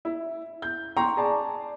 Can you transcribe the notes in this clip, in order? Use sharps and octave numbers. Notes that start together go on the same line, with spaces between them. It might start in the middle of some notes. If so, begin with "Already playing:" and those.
E4
G6
G5 A#5 C6 C#6
G#4 D5 A5